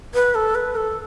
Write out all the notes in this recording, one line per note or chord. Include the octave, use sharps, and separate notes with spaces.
B4
A4
B4
A4